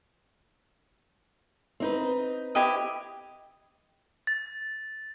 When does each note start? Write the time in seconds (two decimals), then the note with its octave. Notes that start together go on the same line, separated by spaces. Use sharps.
1.80 C4 D#4 B4
2.55 E4 G4 D#5
4.27 A6